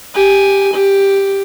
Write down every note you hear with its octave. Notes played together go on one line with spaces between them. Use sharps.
G4 G#5
G4